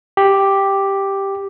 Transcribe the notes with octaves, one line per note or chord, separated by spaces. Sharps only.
G4